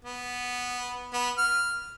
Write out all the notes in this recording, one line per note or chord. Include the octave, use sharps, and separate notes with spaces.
B3
B3
F6